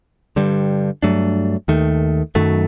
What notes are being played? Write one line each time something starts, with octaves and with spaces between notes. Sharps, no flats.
G2 D3 G3
G2 F#3 A3 D4
D#2 D#3 A3
F#2 D#3 F#3 A3